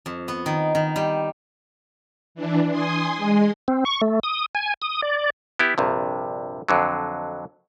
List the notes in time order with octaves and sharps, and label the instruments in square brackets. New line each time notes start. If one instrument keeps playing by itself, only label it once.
[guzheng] F2
B3
D#3
D#3
G3
[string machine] E3 D4
G#5 C6 D#6
G#3
[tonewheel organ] C4
C#6
A3
D#6
G#5
D#6
D5
[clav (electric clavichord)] B3 E4 G4
A#1 G2 C3
F2 D3 F#3